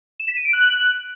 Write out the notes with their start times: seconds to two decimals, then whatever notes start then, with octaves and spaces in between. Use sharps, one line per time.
0.20 E7
0.28 B6
0.36 D#7
0.45 D7
0.53 F#6